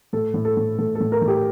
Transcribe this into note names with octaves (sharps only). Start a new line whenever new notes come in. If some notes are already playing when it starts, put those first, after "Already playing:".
A2 A4
A2
A4
A2
A2 A4
A4
A2
A#4
A2
G4